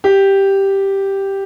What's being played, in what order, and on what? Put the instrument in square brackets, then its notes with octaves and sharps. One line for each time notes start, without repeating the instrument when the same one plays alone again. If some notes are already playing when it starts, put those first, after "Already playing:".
[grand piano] G4